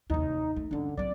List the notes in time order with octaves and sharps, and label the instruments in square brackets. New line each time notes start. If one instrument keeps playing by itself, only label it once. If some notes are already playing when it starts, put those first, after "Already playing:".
[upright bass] F1 D#2 [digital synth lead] D#4
[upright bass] A3
[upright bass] G2 C#4 [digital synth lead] D3
[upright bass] F#3 C4 [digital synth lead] D5